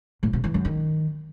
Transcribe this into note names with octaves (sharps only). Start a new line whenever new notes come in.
A2
C3
E3
F#2
D#3